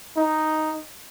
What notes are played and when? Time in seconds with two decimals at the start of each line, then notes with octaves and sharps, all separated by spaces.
0.17 D#4